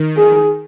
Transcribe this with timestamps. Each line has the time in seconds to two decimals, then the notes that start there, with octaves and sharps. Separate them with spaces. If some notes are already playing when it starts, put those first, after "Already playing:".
Already playing: D#3
0.17 G#4